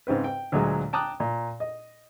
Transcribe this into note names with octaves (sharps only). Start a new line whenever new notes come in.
G#2 C#3 C4 B4
G5
D2 A#2 F#3 G#3
G5 A5 A#5 D6 D#6 F#6
A#2
D#5